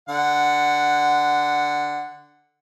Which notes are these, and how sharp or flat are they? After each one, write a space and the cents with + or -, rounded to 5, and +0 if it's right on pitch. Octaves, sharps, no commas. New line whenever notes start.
D3 +0 F#5 +0